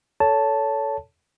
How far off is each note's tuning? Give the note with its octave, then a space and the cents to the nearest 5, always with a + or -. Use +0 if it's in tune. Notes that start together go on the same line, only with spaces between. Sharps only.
A4 +0 C#5 +20 A5 +0